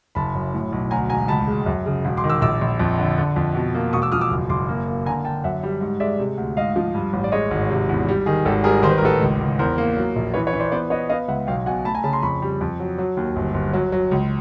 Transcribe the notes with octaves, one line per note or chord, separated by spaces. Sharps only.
F#1 A5 B5
F#2
A2
B1
D2 G#5 A#5
E1 G#5 A#5
C#2 A5 B5
G#3
F#2
C#3
E1
C6 D6
D#3
D6 E6
A#1 D6 E6
A#1
F2
D3
D3
F2
B2
A#3
E1 C#6 D#6
D6 E6
F3 D#6 F6
D6 E6
F#1
F#1 C6 D6
A#3
A#3
D3 G#5 A#5
D3 G5 A5
F#2 E5 F#5
G3
G#2
G#3 D5 E5
C3
D2
G#2 D#5 F5
F3
G2
A1
D5
G#3 C#5 D#5
G#1
C3
E2
G3
D#3 G#4
G#1 G4 A4
G3 G#4 A#4
D#3 C5
B4
A#4
A1 A4 B4
C#2
C#2
E2 A#4 C5
A#3
F#3
A#1
E3 B4 C#5
B4 C#5
E3
C5 D5
B3 C5 D5
B3 C#5 D#5
B3 D#5 F5
C#2 E5 F#5
B1 F5 G5
B2 F#5 G#5
A3 A5 B5
G#5 A#5
C#3 A5 B5
A#5 C6
F2 B5 C#6
G3
F2
F#3
F#3
D#2
G1
G1
F#3
F#3
C#2